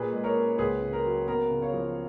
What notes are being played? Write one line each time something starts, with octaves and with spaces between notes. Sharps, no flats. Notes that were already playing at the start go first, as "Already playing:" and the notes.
Already playing: A#2 G#4 B4
G#3
A#4 C#5
C#4
C#2 G#4 B4
C#3
A#4
F#3
B3 A#4
C#3
C#5 F5
F3